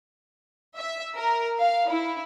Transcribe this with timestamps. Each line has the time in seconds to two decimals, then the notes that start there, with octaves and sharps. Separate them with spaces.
0.77 E5
1.16 A#4
1.59 F5
1.89 E4